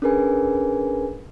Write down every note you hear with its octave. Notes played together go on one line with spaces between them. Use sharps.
C#4 D4 G#4 A#4 B4 G#5